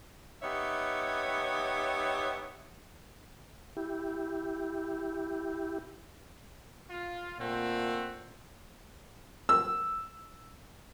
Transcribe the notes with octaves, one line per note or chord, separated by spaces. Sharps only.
B3 D#4 G4 C#5 E5
E4 G4
F4
A#2 A3 C4 F#5
E6